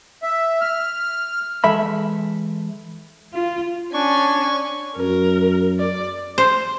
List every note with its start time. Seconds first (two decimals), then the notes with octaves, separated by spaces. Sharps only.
0.23 E5
0.61 F6
1.64 E3 G#3 A4 E5 B5
3.34 F4
3.94 C#4 D4 G#5 C#6
4.97 F#2 A#4
5.79 D5
6.38 C5